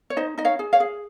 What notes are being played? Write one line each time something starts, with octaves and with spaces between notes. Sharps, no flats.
C#5
D#4 C5 D#5
D#4 D#5
C#5 F5
G#4
C#5 F5
G#4